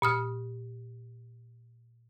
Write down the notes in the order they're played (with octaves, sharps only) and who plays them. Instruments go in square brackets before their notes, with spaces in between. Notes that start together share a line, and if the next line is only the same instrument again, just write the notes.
[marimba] A#2 D#6 F6